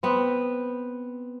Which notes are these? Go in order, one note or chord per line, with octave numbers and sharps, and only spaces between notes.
B3 C4